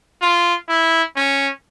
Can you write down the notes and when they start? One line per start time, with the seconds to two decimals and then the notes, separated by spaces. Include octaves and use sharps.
0.21 F4
0.69 E4
1.16 C#4